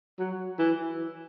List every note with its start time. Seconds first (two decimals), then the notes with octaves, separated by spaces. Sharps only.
0.19 F#3
0.59 E3